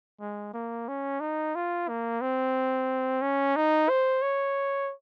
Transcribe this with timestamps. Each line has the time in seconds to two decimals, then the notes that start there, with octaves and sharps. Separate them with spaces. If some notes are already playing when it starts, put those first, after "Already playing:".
0.21 G#3
0.54 A#3
0.88 C#4
1.21 D#4
1.55 F4
1.89 A#3
2.21 C4
3.22 C#4
3.56 D#4
3.89 C5
4.22 C#5